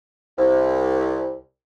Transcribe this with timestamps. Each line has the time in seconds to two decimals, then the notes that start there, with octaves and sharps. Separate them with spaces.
0.38 C2